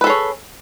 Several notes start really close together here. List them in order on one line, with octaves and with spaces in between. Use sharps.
B4 A4 G#4 C#5